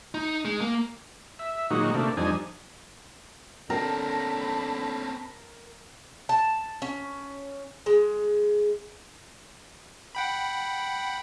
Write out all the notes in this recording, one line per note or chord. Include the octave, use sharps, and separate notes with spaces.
D#4
G#3
A#3
E5
A#2 D#3 F#3 G#3 D#4 F#4
C3 A3 A#3 D4
F2 G3 D4 D#4 G#5
D3 C4 C#4 A#4 A5 B5
A5
C#4
G#3
F#5 G5 B5